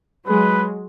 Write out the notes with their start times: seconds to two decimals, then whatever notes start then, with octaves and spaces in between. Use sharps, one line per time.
0.28 F#3 G#3 B4